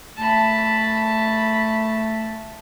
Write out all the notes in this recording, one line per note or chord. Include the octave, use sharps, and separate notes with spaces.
A3 A5 B5